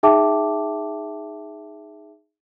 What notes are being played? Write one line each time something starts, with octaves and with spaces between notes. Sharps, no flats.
D#4 G#4 E5 G5 A5 D6